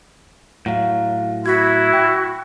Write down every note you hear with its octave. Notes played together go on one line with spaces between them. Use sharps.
A2 F#3 F5 F#5
E4 F#4 G#6 B6
G5